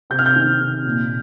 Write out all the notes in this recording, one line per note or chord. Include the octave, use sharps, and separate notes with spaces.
C3 G6
F6
G6
D#3
C3
A#2